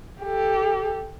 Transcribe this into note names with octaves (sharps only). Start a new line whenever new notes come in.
G4 A4